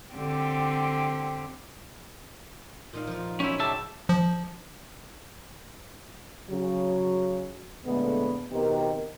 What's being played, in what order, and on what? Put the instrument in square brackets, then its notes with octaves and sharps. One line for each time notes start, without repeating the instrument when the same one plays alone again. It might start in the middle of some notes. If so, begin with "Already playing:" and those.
[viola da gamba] D3 C4 G4
[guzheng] A#2 D#4 F5
F3 F4
[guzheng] F#3 C5 C#5 [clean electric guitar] C#4 E4
[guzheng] C#3 [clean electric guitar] G3 E5 A5
[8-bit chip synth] F3
[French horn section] C#3 F#3
A#2 D3 G#3 A3 B3
B2 D#3 B3 C4 G4 A#4